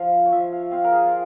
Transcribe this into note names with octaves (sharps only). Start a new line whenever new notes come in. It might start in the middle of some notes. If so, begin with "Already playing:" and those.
Already playing: F3 F5
C#5
F3 E5
F5
C4 F5
A#4
G#4
F4